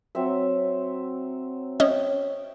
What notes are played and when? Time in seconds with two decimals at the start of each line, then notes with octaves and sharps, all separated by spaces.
0.15 F#3 C4 E5
1.80 C#4 C#5 D#5 E5 G5